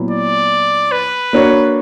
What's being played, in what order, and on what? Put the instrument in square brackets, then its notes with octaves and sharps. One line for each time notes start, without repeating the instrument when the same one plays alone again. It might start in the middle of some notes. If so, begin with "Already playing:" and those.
Already playing: [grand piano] A#2 F#3 B3 E4
[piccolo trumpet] D5
B4
[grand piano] A#3 D4 F#4 C#5